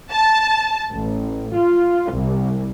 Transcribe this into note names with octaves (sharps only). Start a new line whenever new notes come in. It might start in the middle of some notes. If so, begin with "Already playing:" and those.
A5
A1
F4
C2